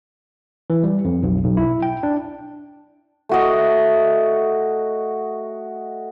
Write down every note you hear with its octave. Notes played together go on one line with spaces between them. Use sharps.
E3
G3
F2
B1
B1
E4
G5
D4
A3 F#4 D#5